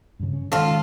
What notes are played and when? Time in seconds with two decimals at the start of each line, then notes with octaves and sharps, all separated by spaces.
0.19 G2 C#3
0.33 C#4
0.52 D#3 G#3 C#4 F4 A4